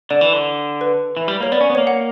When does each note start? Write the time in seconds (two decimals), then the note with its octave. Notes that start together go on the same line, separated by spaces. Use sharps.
0.10 D3 D5
0.21 E3
0.33 D3
0.81 B4
1.17 E3
1.28 G3
1.40 A#3 C#5
1.52 B3 D5
1.61 C#4
1.70 B3
1.75 C#5
1.78 A#3
1.87 F#5